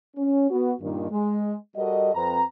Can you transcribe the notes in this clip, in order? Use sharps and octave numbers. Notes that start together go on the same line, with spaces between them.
C#4
B3 F#4
G2 A#2 D#3
G#3
G3 F#4 A4 A#4 D#5
F2 C4 B4 A#5